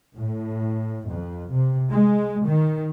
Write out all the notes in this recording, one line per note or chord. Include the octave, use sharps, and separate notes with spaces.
A2
F2
C3
G#3
D#3